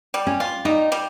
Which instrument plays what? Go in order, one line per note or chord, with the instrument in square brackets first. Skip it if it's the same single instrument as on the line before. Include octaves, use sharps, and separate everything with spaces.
[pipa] G3
[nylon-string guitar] C#4
[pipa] F4
[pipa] G3 [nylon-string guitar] D#4
[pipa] G3